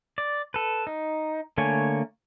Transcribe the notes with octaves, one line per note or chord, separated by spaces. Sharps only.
D5
A4 B4
D#4
D3 A3 A#3 C#5 G#5